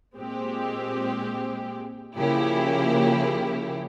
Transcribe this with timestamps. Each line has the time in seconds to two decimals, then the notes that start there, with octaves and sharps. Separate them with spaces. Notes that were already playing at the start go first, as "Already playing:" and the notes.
0.16 A#2 G#3 C4 G4
2.16 C#3 F3 A#3 E4 G4